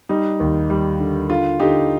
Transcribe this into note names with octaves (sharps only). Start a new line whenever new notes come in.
G3 D#4
D#2
G3
D3
D3 F4
D3 D#4 G4